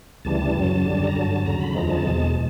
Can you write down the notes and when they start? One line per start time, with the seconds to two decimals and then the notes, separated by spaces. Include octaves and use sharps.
0.25 D2 C#3 E3 G3 A5
0.55 F#2 C#3 F#3
0.85 F#2 D3 G3
1.07 A#5
1.15 G2 D3 F#3 A5
1.46 D#2 C#3 F#3 A#5
1.61 B5
1.75 F2 D3 F3 G#3 A#5
1.90 A5
2.05 E2 B2 G#3